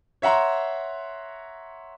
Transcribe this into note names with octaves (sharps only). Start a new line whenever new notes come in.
C#5 E5 F#5 A#5 C6